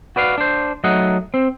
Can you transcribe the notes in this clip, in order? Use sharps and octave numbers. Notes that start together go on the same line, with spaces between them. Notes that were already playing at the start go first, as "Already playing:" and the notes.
F#4 B4 D5 F5
D4 C5
F#3 A3 D#4 D#5 F#5
C4